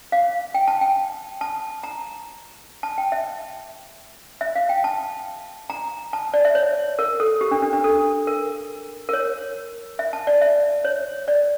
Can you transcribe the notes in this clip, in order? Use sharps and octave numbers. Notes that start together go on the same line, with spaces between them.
F5
G5
A5
G5
A5
A#5
A5
G5
E5
E5
F5
G5
A5
A#5
A5
D5
E5
C#5
A#4
A4
G4
D4
D4
D4
A4
A#4
A#4
C#5
E5
A5
D5
E5
C#5
D5